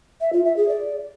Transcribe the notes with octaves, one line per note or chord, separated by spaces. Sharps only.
E5
F4
E5
G#4
D5